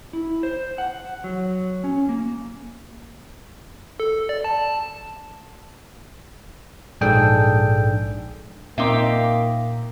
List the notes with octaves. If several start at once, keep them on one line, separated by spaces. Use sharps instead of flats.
E4
C5
F#5
F#3
C#4
A#3
A4
D5
A5
A#1 G#2 D4 G#4 A4 G5
A#2 A#3 C4 D#4 E5 F5 G5 D6